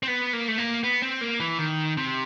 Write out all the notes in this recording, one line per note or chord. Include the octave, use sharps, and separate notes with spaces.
C4
B3
A#3
A3
A#3
B3
C4
A#3
E3
D#3
C3